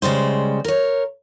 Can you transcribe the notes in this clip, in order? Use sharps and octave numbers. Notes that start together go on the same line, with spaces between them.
C#3 G3 G#3 C5
A#4 C#5